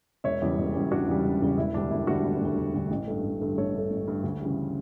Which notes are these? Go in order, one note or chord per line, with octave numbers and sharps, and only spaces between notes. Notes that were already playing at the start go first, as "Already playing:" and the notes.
E1 C#5 E5
E2 C#3 G3
E1
E2 C#3 G3
E1 D4 F#4
E2 C#3 G3
E1
E2 C#3 G3
E1 E4
D2 D3 G3 D4
E1 E4
D2 D3 G3 D4 F#4
E1
D2 D3 G3
E1
D2 D3 G3
A1
G2 D3 A3
A1
G2 D3 A3
A1 A4 C#5
G2 D3 A3
A1
G2 D3 A3
D2
C#3 E3 G3